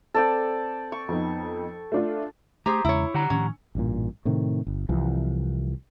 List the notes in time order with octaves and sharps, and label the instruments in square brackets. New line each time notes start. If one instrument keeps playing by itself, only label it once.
[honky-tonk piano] C4 [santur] A4 D5 G5
[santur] C#6
[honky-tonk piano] F2 B3 D#4
A3 D4 F4
[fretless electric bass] A3 [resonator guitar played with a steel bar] G4 G#4 C5 [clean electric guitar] A#5
[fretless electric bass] E2 C#3 G#3 [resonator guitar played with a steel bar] E4 C#5
[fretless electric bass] D3 [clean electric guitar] G4 F#5 A#5
[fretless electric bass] A2 D#3 F3 [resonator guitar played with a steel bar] C#4
[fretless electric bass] A1 G2 A#2
A2 C3 D#3
G1
C2 E3 F3